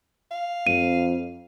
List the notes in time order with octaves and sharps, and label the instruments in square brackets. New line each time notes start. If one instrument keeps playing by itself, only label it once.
[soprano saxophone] F5
[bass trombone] F2 [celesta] D#7